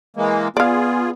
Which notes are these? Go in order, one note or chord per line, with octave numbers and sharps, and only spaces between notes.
E3 G#3 A#3
B3 F4 G#4 D5 F5